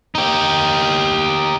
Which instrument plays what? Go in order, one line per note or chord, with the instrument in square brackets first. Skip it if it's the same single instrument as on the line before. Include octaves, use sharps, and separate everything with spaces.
[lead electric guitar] D#4 G4